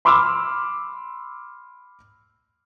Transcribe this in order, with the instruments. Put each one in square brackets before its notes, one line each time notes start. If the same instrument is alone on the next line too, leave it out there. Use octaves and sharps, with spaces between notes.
[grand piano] B5 C6 D6 E6 F6